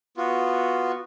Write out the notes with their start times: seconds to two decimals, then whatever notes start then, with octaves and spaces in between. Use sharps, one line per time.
0.17 B3 F4 F#4